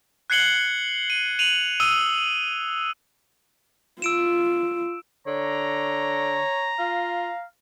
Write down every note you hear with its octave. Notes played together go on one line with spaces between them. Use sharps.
F#6 G#6 C7 C#7 F#7 G7
D#7
D#7 F7 F#7
D#6 E6 D#7 G7
F4 E6 D7 E7
D3 C#5 A#5
F4 F5